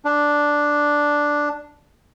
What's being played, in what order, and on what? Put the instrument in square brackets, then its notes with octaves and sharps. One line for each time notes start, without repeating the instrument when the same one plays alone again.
[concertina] D4